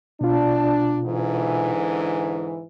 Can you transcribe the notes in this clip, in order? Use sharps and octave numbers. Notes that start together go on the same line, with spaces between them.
B2 D4 F4
G#2 D3 E3